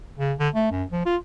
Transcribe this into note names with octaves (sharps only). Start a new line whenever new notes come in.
C#3
D3
A3
F#2
F3
F4